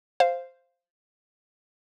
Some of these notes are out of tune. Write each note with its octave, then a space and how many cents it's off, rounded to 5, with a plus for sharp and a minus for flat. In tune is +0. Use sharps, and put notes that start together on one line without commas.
C5 +0 F5 -10